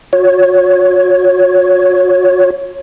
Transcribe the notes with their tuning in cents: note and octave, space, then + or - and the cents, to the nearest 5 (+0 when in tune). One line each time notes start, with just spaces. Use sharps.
F#4 -45 C#5 +0